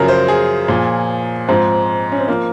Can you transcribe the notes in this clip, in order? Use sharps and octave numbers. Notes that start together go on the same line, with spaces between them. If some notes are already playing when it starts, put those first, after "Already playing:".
Already playing: F#2 C#3 F3 A#4
C5
G#4
A#2 F3
G#2 F3 C4
C#4
C4
F3 A#3